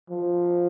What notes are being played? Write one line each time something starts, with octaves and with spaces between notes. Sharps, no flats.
F3